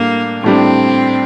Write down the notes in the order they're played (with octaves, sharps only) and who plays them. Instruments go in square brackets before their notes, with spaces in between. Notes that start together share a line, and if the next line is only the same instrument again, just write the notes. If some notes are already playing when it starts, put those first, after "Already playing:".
Already playing: [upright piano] A2 G3 D4 [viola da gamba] A#3
[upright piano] A2 G3 D4 [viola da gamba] C4